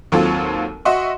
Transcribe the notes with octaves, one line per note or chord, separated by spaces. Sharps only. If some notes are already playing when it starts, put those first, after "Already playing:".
D#2 F#3 C4 F4 A4
F#4 D#5 E5 F#5 C6 C#6